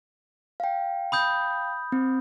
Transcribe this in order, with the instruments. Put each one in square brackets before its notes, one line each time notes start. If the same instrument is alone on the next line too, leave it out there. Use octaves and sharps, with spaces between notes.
[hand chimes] F5 G5
[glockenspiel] B5 D#6 G6
[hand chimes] C4